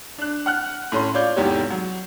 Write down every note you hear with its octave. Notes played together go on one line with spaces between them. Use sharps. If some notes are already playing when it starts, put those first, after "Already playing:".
D4 F#6
F#5 F6 F#6
A2 C#4 C6
F4 C#5 D5 F5 G6
F1 E2 G#2 B3 G4 C#5
F#3